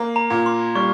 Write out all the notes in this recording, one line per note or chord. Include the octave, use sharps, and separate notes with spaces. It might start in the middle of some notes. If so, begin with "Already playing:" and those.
Already playing: A#3
A#5
A#2
C6
G3 C#6